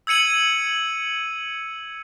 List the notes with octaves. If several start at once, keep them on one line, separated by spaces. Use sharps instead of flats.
E6 G#6 C#7 D#7 F#7